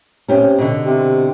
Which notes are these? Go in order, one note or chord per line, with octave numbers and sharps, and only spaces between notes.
C3 C#4 G4 C5
B2 D3
C3